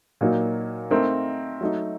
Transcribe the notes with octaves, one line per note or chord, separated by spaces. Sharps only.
A#2 F#3 A#3 D#4
A3 C4 D#4 A#4
F#3 A3 D#4